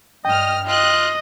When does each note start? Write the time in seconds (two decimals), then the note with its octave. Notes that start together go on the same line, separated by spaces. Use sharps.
0.25 G2 D#5 G5 F6
0.68 F4 D#5 F#6